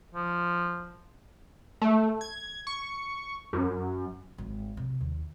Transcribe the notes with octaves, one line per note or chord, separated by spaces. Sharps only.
F3
A3
G#6
C#6
F#2
G#1
C3
D#2